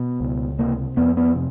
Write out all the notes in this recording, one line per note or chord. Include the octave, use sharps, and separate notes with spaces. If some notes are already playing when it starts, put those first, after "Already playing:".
Already playing: B2
C#2
C3 A#3
F2 B3
B3
C3